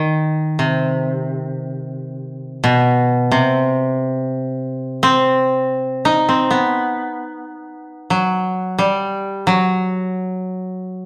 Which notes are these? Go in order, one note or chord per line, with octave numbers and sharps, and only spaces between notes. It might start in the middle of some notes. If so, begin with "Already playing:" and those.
Already playing: D#3
C3
B2
C3
C4
D#4
C4
B3
F#3
G3
F#3